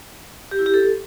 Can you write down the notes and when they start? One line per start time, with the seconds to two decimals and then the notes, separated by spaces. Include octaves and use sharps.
0.51 G4
0.59 E4
0.66 G4
0.74 A4